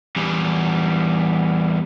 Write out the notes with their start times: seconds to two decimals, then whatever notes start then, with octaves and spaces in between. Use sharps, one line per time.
0.16 E2 G3